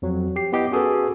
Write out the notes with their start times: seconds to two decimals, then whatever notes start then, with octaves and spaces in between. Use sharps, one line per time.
0.02 F2 F#3
0.36 G4 C7
0.52 B3 E4 G4 D#5 F#5 G5
0.71 C#4 F#4 G#4 A4 B4